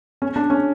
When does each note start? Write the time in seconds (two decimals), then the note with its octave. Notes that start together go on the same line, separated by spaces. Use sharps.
0.22 C#4
0.36 D4
0.50 C#4